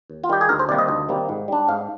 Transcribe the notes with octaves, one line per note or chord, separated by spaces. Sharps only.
D#2
F4
D#3 G3 G4
G#4
D2 A#4
C5
C3 D#3 G3 A#3 D5
D#5
D2
C3 D#3 G3 A#3
G#2
G3 D4
G#2 F5